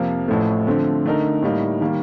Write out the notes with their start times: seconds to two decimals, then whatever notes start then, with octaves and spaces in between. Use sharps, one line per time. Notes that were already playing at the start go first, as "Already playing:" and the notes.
Already playing: F2 C3 F3 A#3
0.28 A1 A2 F3 A3
0.67 D3 F3 A3 C4
1.05 D3 A3 D#4 A#4
1.42 A2 G3 A#3 D#4
1.81 D#3 G3 A#3